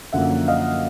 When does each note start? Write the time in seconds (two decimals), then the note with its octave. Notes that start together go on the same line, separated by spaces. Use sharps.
0.13 F#2 D3 F3 A#3 E5 F#5
0.48 D#5 F5